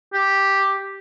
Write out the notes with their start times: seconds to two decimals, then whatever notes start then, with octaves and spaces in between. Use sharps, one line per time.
0.13 G4